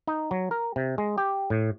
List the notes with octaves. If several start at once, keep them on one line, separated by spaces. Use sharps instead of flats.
D#4
F#3
A#4
C3
G#3
G4
A2